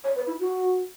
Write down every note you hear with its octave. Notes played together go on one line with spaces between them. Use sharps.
C#5
B4
E4
F#4